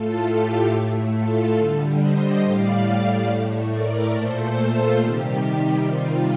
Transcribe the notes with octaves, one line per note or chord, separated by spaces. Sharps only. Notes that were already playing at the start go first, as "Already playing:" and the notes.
Already playing: A2 A3 F4 A4
G4
A2 A3
F4 A4
D3 G3
C5 D#5
A2 G3 D5 F5
D5 F5
A2 A3
A#4 D5
A#2 A3 A4 C5
F4 A4
C3 D#3 G3 G4
C3 D#3 G3 F4